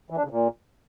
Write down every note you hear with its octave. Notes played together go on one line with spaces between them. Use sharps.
E3
D4
C#3
A#2